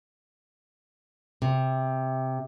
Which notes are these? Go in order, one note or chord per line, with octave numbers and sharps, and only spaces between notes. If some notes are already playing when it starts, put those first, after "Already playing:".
C3